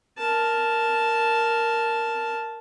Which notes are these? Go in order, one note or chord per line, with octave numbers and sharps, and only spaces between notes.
A#4 A5